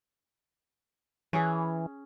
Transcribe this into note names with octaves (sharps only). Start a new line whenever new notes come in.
E3 C#4 G#4